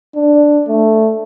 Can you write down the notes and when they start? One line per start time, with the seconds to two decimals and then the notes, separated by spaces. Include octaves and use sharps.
0.16 D4
0.68 A3